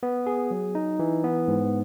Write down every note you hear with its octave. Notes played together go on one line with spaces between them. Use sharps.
B3
G#4
F#3
D#4
E3
B3
G#2